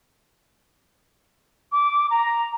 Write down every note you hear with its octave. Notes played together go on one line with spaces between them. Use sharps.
D6
A#5